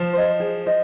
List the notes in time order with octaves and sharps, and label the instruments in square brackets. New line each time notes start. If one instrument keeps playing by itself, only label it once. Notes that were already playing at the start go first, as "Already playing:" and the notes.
Already playing: [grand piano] F3
[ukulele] C5 D#5
G#4
C5 D#5